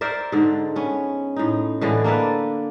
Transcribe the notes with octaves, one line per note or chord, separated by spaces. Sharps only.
A#4 C5 D5 E5
G#2 D3
B3 C#4
A2 D#4
A2 D3 E3 G#3
A#3 D4 A4 B4